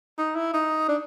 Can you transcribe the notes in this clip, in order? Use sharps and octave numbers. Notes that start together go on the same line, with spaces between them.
D#4
E4
D#4
D4